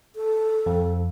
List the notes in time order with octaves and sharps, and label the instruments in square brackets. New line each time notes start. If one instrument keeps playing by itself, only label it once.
[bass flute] A4
[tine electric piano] F2